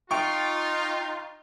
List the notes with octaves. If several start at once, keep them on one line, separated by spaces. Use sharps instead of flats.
D#4 F4 G5 C#6